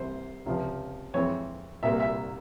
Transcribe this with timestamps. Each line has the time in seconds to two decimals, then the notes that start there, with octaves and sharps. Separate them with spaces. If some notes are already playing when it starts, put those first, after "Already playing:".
Already playing: C2 C3 E3 C5
0.46 C#2 C3 F3
1.14 F2 E3 G#3 C4 C#5
1.83 C2 A#2 G3 A#3 E5
2.00 E5